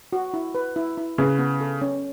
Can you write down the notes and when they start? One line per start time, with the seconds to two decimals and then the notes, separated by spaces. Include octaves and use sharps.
0.13 F#4
0.34 E4
0.55 B4
0.76 E4
0.97 E4
1.18 C#3 B4
1.39 B3
1.61 A4
1.82 C#4